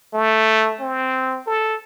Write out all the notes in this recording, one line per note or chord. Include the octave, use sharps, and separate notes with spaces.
A3
C4
A4